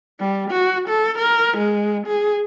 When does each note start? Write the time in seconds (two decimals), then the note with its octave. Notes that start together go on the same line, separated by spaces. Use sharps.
0.20 G3
0.51 F#4
0.89 A4
1.19 A#4
1.58 G#3
2.07 G#4